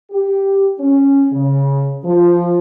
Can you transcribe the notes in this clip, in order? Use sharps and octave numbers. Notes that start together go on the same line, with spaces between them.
G4
C#4
C#3
F3